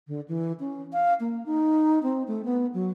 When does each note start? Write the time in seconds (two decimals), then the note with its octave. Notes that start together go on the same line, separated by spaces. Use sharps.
0.08 D3
0.28 E3
0.60 C#4
0.93 F5
1.20 A#3
1.46 D#4
2.03 C4
2.28 A3
2.45 B3
2.74 F#3